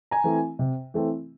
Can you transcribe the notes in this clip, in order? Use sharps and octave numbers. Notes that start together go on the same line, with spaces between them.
G#5 A#5
E3 A3 C4
C3
E3 A3 C4